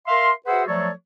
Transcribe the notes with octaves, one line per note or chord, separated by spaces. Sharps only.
A#4 E5 F5 C6
F#4 G#4 B4 C5 E5 F#5
F3 F#3 A3 A4 C#5 D5